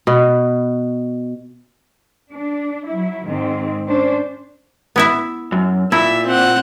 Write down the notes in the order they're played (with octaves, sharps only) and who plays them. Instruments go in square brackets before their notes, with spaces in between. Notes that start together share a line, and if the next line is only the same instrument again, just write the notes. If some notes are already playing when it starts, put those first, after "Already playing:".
[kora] B2
[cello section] D4
F#3 E4
G#2 D#3 G#3 C4
C#4 D4 C5
[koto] B3 E4 E5
[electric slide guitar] F#2
[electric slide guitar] A#2 [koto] E4 [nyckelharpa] E5
[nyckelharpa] C4 F#5